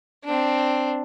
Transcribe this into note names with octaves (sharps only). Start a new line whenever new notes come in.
C4 D4